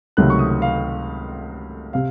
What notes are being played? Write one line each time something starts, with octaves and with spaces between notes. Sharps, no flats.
C#2 C3 D#3 F#3 A3 F#6
C#6
D#6
F5
C3 F5